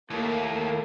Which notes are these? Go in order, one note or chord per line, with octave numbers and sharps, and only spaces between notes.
D#2 A2 A#3 A4